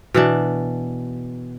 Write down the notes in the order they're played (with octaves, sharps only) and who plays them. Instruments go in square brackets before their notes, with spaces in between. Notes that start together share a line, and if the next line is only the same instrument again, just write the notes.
[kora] B2 E3 D4